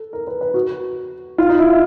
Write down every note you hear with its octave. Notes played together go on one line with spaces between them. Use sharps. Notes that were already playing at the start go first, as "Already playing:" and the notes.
Already playing: A4
A#4
B4
B4
F#4
F4
D#4
E4
F4